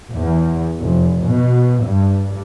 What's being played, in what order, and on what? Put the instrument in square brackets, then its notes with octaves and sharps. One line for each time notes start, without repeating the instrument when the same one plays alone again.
[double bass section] E2
F1
B2
G2